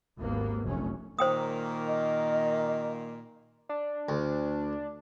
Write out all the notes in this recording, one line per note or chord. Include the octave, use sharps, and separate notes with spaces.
G#1 D#2 A#3 B3
F1 A#1 F#2 A3 C#4
A#2 D#3 A#3 C5 G5 D#6
D#5
D4
D2